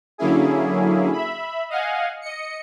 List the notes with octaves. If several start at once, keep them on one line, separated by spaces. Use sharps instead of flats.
D3 F#3 A#3 C#4 E4 G#4
E5 B5
D#5 F5 F#5 G#5
D#5 C#7